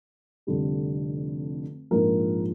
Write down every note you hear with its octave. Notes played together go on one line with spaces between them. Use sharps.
F1 F2 D3 G3
A#1 G#2 F3 A#4